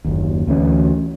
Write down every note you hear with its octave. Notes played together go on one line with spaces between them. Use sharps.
F#1 D#2
D2 E3 C#4